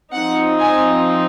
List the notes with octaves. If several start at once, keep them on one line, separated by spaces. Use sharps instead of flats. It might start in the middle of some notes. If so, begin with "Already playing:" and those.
F3 C4 D#4 F#5
G#5